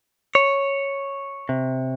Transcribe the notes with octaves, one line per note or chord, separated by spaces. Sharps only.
C#5
C3